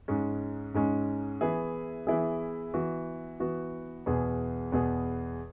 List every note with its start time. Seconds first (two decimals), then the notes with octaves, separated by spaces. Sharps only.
0.08 G#2 G#3 C#4
0.74 G#2 G#3 C#4
1.41 E3 B3 E4 G#4
2.07 E3 B3 E4 G#4
2.74 E3 B3 F#4
3.40 E3 B3 F#4
4.06 E2 B2 B3 G#4
4.72 E2 B2 B3 G#4